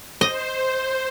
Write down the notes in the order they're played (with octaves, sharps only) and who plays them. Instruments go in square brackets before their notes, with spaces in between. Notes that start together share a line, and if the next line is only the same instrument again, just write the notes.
[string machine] C5 [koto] D#5